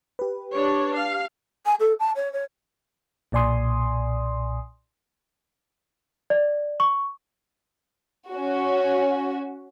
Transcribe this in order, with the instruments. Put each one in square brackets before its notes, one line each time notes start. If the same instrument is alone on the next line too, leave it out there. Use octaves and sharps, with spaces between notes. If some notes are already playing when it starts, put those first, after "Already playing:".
[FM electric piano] G4 B4
[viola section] D4 C#5
F5
[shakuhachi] G#5
A4
A5
C#5
C#5
[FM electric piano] B1 A#2 D5 G#5 C6 D#6
[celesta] D5
C#6
[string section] C#4 F#4